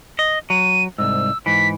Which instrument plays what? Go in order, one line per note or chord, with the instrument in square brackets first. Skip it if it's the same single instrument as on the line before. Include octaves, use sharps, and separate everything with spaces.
[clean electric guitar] D#5
[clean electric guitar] F#3 [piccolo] D#7
[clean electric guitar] C2 G#2 [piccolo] E6
[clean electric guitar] G#2 E3 [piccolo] B6